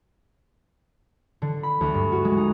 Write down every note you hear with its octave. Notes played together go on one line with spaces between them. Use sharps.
D3
B5
D2
G2
F#4
G#3
D#4